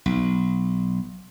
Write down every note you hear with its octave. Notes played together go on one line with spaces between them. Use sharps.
B1